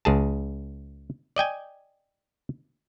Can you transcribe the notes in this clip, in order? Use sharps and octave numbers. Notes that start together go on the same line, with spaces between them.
C#2 G#4 A5
D5 D#5 G5 G#5